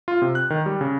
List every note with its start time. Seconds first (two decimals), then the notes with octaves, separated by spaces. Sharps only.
0.08 F4
0.22 C3
0.35 F#6
0.50 D#3
0.66 G3
0.81 C#3